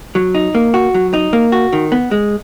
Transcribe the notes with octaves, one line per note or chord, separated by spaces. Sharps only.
F#3
D#4
A#3
F#4
F#3
D#4
A#3
F#4
D#3
B3
G#3